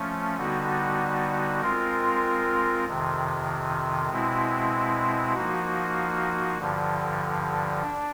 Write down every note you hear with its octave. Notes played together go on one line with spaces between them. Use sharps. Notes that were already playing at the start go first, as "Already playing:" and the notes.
Already playing: F3 A3 C#4
D3 G3 B3 D#4 F#4
G#3 C4 F4 A#4
F2 C3 D#3
B2 G#3 C4 E4
F3 A#3 D#4 F#4
G2 D3 F3
D4